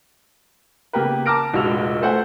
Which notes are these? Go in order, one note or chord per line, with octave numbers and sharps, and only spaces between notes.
C#3 A#3 B3 G4 A#4 B4
A5 A#5 D6 F6 A#6 D7
F1 A#1 G#3 F#4 E6 F7
A3 A4 C5 F#5 G#5